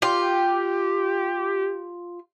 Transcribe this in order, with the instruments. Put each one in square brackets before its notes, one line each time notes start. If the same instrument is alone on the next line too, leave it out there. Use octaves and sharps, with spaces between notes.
[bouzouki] F4 [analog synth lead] G4